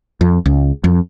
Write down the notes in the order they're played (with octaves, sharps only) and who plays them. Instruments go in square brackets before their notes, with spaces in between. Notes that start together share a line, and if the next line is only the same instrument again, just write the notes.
[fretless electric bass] F2
C#2
F2